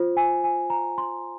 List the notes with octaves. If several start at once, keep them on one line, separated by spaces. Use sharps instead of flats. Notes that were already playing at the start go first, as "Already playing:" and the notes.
Already playing: F4 C5
G#5
G#5
A#5
C6